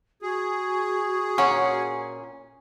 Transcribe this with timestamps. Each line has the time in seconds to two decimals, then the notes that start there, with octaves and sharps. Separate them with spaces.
0.22 F#4 G#4
1.38 A#2 C#4 F#5